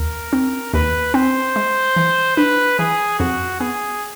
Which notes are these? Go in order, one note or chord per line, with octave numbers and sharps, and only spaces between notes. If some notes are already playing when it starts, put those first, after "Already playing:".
Already playing: D#2 A#4
C4
D#2 B4
C4 C5
G#3
E3
D4 B4
E3 G#4
F2 F#4
B3 G#4